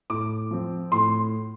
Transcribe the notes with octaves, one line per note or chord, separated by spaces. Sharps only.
A2 D6
F3 C4
A2 C6